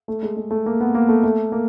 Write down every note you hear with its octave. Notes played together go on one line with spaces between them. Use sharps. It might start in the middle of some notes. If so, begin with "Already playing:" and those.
A3
G#3
G#3
A3
A#3
B3
A#3
A3
A3
A#3